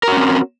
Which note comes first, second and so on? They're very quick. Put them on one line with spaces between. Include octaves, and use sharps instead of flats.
A#4 F#4 C#4 C4